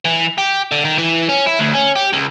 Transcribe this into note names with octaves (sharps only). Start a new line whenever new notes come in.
E3
G4
D3
D#3
E3
C#4
E4
D2
C#4
G4
C#2